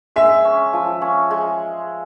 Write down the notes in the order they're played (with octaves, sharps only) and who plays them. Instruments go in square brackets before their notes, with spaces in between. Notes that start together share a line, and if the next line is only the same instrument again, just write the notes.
[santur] G#3 [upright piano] E5
[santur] C#4
F3
C#4
G#3